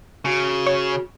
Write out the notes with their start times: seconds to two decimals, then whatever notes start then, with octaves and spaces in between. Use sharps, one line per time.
0.25 C#3 F#4
0.67 C#5